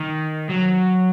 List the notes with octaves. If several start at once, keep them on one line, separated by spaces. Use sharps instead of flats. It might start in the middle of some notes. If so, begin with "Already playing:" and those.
Already playing: D#3
F#3